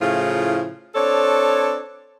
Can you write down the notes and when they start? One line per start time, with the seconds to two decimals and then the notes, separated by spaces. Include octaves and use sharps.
0.01 A2 C#3 F3 E4 F4
0.95 C4 D4 A4 C#5